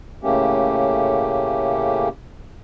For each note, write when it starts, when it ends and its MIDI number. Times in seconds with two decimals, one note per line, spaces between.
0.23 2.09 45
0.23 2.09 49
0.23 2.09 57
0.23 2.09 58
0.23 2.09 61
0.23 2.09 67